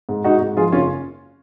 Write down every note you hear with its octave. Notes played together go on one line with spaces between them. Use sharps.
G#2
G#2 D#4 F#4
G#2
F3 F4 G#4
F#1 C#4 F4